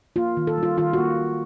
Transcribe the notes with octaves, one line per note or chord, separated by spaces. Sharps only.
A#3 F4
D#3
A4
G3
F4
D#3 F4
F#4
A#3